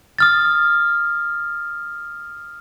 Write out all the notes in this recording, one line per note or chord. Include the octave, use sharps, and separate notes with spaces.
D#6 F6 A6